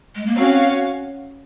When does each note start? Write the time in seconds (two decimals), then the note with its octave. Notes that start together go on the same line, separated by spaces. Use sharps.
0.15 G#3
0.26 A#3
0.36 C4 C#4 F#4 C#5 F5